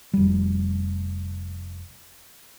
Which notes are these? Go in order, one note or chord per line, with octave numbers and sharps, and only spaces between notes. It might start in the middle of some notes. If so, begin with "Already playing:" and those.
F1 G3